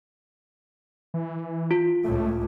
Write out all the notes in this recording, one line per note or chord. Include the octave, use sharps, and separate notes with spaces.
E3
F4
C#2 A2 A3